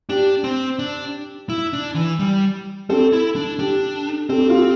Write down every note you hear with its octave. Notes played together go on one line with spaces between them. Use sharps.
D4 G4
C4
D4
E4
D4
E3
G3
C4 A4
E4
D4
D4 G4
C4 A4
G4
F4
G4